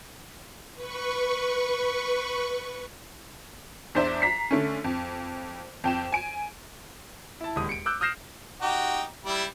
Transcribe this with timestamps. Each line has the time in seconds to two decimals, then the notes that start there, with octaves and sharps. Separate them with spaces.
0.74 B4 C#6
3.95 E2 D4 C5 E5 E7
4.22 A#5 B6 C7
4.51 D3 A3 C#4
4.84 F2
5.84 F2 G5 E7
6.12 G#5 D7
7.41 E4 A5
7.56 E1 D#2 D#6
7.69 C#7 D7
7.86 D6 E6 F#6 G6
8.01 D#6 F6 G6 A#6 C7 E7
8.61 D#4 F#4 G4
9.26 G3 E4